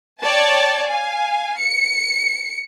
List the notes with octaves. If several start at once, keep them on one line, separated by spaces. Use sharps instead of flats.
C#5 D5 G5 A5
F5 G#5
C#7